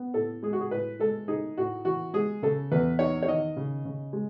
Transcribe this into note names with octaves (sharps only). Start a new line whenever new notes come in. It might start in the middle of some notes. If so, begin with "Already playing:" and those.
Already playing: B3
A2 A4
G#3 G#4
F#4
G#4
A2 B4
G#3 A4
D#4 G#4
A2 F#4
E3 F#4
G#3 G#4
C#3 A4
E2 B4
D#4 C#5
C#5
D#3 D#5
C#3
C#3
G#3